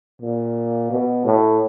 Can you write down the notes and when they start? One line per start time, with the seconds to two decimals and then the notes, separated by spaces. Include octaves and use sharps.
0.22 A#2
0.91 B2
1.25 A2